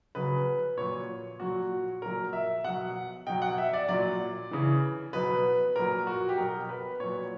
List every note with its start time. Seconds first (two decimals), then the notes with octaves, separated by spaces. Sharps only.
0.15 C#3 F#3 B4
0.77 A#2 F#3 C#5
1.40 A#2 F#3 F#4
2.02 A#2 F#3 A#4
2.33 E5
2.64 B2 F#3 F#5
3.27 B2 F#3 G5
3.42 F#5
3.58 E5
3.73 D5
3.88 A#2 F#3 D5
4.51 C#3 E3
5.13 B2 F#3 B4
5.76 A#2 F#3 A#4
6.07 F#4
6.29 G4
6.38 B2 F#3 A#4
6.69 B4
7.00 A#2 F#3 C#5